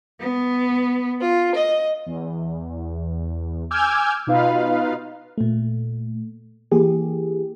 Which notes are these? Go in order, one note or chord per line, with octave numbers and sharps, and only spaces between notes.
B3
F4
D#5
E2
G#5 D6 E6 F6 G6 G#6
B2 D#4 F4 B4 F5
A#2 A3
E3 A#3 G4 G#4